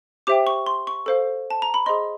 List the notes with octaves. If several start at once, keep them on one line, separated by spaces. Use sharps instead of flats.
G4 C5 E5 G5 D6
C#6
C6
C#6
A4 C5 F5
A5
A#5
B5
G#4 C5 D#5 C6